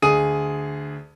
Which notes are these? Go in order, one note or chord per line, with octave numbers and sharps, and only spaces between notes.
D2 G#4 D#6 D#7